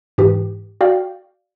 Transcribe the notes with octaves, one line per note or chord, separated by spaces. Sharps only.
G#2 E3 G4
F#4 D5 F5 G5